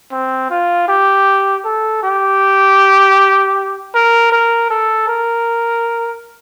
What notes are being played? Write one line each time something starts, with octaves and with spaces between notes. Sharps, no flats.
C4
F4
G4
A4
G4
A#4
A#4
A4
A#4